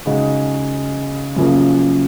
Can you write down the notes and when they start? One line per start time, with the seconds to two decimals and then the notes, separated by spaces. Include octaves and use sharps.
0.06 C#3 G#3 D#4 F#4
1.36 F#2 C#3 F3 A#3 C#4